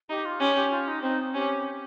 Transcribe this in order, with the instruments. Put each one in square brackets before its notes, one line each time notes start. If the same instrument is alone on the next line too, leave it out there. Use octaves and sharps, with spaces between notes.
[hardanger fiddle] D#4 [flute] G4
[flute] F4
[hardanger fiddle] C#4 [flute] G4
[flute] G4
F4
D#4
[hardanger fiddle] C4 [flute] D#4
[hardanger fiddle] C#4 [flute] G4